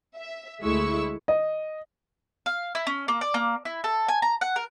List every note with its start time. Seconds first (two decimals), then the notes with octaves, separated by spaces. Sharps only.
0.16 E5
0.62 D2 G#3 A3 E4 C#6 E6
1.28 D#5
2.46 F5
2.75 E4
2.87 C#4
3.08 A#3
3.21 D5
3.34 A#3
3.65 E4
3.84 A4
4.08 G#5
4.22 A#5
4.41 F#5
4.56 A#4